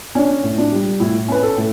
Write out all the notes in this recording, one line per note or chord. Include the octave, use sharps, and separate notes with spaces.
C#4 D4
A2
D4
G3
A2 E4
C#4 B4
A4
A2